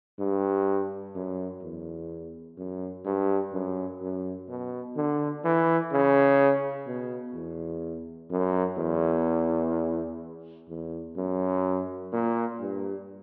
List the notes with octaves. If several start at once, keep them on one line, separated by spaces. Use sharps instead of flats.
G2
F#2
E2
F#2
G2
F#2
F#2
B2
D3
E3
C#3
B2
E2
F#2
E2
E2
F#2
A#2
G2